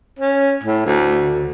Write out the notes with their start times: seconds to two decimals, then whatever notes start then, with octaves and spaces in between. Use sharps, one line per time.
0.19 C#4
0.63 A2
0.86 D2